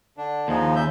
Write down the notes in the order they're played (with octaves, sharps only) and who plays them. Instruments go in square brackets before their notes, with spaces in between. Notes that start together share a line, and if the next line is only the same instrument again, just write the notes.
[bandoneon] D3 D4
[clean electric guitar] D#2 [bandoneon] F3 G#3 D#4
[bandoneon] C#3 E5 G6